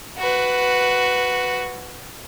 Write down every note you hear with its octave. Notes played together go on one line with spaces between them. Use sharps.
F#4 B4